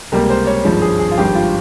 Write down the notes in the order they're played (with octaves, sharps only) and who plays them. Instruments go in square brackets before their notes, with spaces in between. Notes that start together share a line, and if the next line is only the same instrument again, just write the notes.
[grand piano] C#2 C3 G3 A#3 A#4
C5
C#5
G#1 G2 F3 G#3
G#4
G#4
F4
G#1 G2 F3 G4
F4